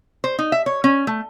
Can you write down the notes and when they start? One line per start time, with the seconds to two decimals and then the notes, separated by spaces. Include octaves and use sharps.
0.24 C5
0.39 D#4
0.52 E5
0.66 C#5
0.84 C#4
1.07 A3